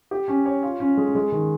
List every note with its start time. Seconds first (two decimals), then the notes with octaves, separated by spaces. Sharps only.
0.11 G4
0.28 C#4
0.46 C#5
0.63 F4
0.80 C#4
0.97 G#3
1.15 G#3
1.32 D#3